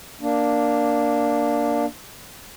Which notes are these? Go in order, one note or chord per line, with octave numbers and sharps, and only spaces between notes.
A#3 D4